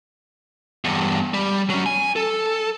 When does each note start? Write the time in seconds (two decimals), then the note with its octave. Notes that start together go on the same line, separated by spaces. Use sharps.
0.85 E2 G2
1.34 G3
1.70 F#3 C#4
1.86 G#5
2.16 A4